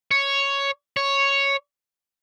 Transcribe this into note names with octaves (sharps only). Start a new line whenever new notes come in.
C#5
C#5